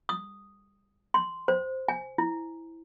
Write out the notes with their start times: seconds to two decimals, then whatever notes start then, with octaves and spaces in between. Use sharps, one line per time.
0.09 D#6
1.14 C6
1.48 C5
1.88 G#5
2.18 E4